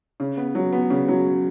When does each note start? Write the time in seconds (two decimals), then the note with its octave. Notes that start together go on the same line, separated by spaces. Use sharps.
0.20 C#3
0.37 B3
0.55 F#3
0.72 B3
0.90 C#3
1.08 F#3